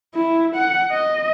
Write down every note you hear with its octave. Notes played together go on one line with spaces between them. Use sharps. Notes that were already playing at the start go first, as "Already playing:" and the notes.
E4
F#5
D#5